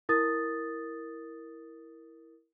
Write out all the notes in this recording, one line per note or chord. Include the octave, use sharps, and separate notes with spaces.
E4 A#4 D#6 A6